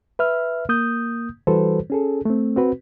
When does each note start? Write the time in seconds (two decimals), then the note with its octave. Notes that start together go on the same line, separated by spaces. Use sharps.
0.19 B4 E5 F6
0.69 A#3 D#6 G6
1.47 E3 G3 F#4 A4 B4 C5
1.90 C#4 G#4 A4
2.25 A3 C4
2.56 C4 F#4 B4